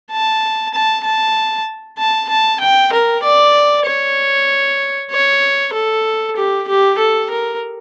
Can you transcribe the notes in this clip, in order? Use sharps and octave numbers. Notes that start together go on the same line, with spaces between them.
A5
A5
A5
A5
A5
G5
A#4
D5
C#5
C#5
A4
G4
G4
A4
A#4